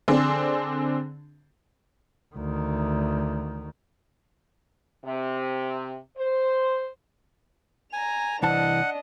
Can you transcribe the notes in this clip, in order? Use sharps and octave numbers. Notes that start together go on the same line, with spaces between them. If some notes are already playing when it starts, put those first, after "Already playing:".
D3 C4 D4 G#4
D2 D#3
C3
C5
G#5 A#5 F7
C2 E3 D4 D#5 F#5 A5